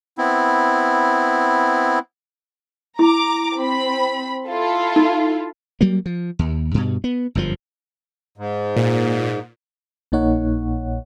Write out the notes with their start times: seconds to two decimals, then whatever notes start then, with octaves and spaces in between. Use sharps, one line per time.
0.18 B3 C4 E4
2.99 E4 A#5 D6
3.58 C4 B5
4.47 E4 F4 A4
4.96 D#4
5.81 F#3 G3 A#3
6.06 F3
6.39 D#2
6.74 G2 B2
7.04 B3
7.35 G1 F#2 C3 F3
8.38 G#2
8.76 A#2
10.12 A#1 A#2 A#3 D#4 C#5 F#5